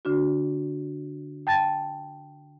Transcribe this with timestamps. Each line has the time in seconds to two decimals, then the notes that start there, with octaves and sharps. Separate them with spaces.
0.05 D3 D4 F#4
1.47 G5 A5 A6